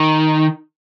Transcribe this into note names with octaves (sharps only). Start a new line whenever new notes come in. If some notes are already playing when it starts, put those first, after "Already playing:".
Already playing: D#3